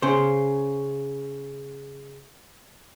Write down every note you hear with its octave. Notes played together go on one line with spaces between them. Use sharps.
C#3 C5